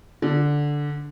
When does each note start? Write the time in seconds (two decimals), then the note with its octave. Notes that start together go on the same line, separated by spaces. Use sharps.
0.22 D3